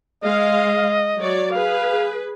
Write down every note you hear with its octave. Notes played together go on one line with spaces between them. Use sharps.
G#3 D#5 F5
F#3 C#5 D5
G#4 B4 F5